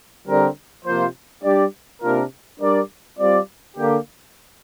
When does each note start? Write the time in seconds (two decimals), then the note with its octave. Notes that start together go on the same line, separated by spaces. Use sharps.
0.26 D3 G3 C4 A#4 D5
0.84 C3 F3 A#3 F4 C5
1.43 G3 D4 G4 D5
2.01 C3 A#3 D4 F4 A#4
2.59 G3 D4 A#4 D5
3.18 G3 C4 F4 D5
3.76 D3 A#3 G4